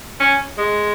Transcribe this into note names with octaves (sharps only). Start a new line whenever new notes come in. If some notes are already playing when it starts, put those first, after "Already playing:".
C#4
G#3